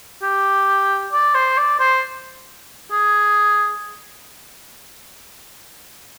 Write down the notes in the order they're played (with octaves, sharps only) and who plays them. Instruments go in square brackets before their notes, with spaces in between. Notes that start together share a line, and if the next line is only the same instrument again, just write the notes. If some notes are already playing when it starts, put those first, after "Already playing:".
[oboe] G4
D5
C5
D5
C5
G#4